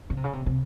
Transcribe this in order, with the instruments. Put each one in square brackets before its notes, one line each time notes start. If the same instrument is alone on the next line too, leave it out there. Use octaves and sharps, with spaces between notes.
[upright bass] C#3
C3
C#3
C3
C3